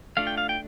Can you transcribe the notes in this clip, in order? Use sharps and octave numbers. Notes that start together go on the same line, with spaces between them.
A3 D4 F4 F5
G5
F5
G5